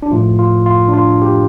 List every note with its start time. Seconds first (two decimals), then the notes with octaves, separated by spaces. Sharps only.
0.02 D4
0.11 A2 F3 A3 F4
0.39 F4
0.66 F4
0.88 D4
0.94 F4
1.22 G4